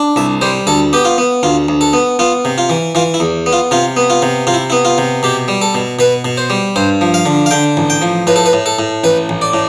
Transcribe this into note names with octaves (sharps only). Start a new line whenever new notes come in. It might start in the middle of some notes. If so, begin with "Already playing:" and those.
Already playing: D4
C2 E5
G3 C5
D2 A4
B3 G4
F4
B3
D2 F4
D2
A4
B3
B3 F4
C3
F4
E3
E3 F4
E4
E2
B3
F4
C3 F4
B3
F4
C3
C3 F4
E4
B3 E4
F4
C3
B2 G4
G3
A4
B2
B2 B4
B2
C5
G3
G2 C5
F3
F5
D3
F5
D3 G5
A1
G5
F3
A2 B4
A4
B4
A2
A4
A2
A1 B4
A1
D5
A2